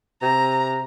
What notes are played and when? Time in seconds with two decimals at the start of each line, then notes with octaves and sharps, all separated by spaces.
0.22 C3 A#5